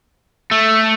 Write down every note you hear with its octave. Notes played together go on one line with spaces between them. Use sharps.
A3